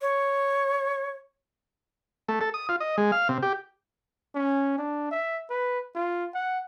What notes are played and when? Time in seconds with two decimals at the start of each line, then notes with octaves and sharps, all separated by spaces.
0.01 C#5
2.28 A3
2.41 A4
2.54 D#6
2.69 F4
2.80 D#5
2.98 G#3
3.12 F5
3.29 C3
3.42 G4
4.35 C#4
4.78 D4
5.11 E5
5.50 B4
5.95 F4
6.35 F#5